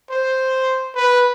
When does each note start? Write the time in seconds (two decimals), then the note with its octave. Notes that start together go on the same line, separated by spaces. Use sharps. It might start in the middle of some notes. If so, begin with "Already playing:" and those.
0.11 C5
0.95 B4